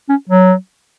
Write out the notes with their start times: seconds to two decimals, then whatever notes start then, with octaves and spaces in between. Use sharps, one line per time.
0.09 C#4
0.29 F#3